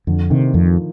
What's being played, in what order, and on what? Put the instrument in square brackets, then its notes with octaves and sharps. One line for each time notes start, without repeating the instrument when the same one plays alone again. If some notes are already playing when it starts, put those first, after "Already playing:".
[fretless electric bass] F2 [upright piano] D3
[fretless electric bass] C3 [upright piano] D#3
[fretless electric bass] F2 [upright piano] F3